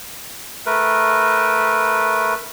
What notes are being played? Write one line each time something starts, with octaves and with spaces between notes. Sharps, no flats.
A3 A#4 B4